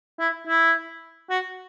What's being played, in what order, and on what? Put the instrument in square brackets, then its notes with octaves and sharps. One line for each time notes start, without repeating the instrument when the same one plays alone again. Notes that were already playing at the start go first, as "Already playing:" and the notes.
[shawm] E4
E4
F#4